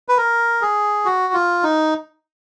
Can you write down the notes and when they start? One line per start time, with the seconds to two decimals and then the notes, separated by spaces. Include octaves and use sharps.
0.09 B4
0.17 A#4
0.62 G#4
1.05 F#4
1.34 F4
1.63 D#4